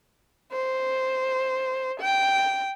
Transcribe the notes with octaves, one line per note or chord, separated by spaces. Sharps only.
C5
G5